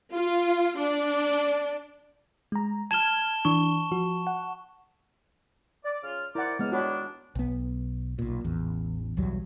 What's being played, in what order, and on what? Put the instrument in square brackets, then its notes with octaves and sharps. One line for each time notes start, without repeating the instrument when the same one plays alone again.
[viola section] F4
D4
[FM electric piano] G#3 A#5
[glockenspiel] A5 E7 G7 [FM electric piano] F6 G#6
[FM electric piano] E3 D4 [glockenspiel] C#6
[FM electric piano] F3 F#4
F#5
[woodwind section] D5
C#3 F4 F6
[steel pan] E4 F#5 [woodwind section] A#4 C5 D5
[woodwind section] F#3 A#3 F6 [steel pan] G#3 B3 D#5
[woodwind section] A#2 D#3 D4 [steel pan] F#4 C#5 B5
[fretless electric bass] B1 B3
B1 A#2
A1 E2
B1 E2 F#3 G3